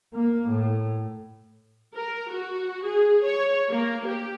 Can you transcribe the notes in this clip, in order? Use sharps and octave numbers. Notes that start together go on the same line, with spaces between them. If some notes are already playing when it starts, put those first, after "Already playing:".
A#3
A2
A#4
F#4
G#4
C#5
A#3
G4